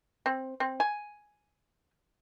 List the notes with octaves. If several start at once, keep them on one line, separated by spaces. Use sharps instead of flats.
C4
C4
G#5